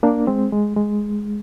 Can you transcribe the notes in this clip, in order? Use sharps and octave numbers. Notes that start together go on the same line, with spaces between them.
A#3 D4
G#3 C4
G#3
G#3